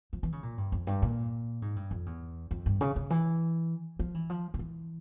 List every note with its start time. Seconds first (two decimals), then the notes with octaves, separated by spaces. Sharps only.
0.13 F3
0.23 E3
0.32 C#3
0.43 A#2
0.58 G2
0.72 F2
0.87 G2
1.02 A#2
1.62 G#2
1.76 G2
1.91 F2
2.06 E2
2.51 F2
2.66 G2
2.81 C#3
2.96 C#3
3.10 E3
3.99 F3
4.15 E3
4.30 F3
4.54 C#3
4.59 E3